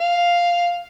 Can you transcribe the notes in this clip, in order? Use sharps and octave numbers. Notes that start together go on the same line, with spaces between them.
F5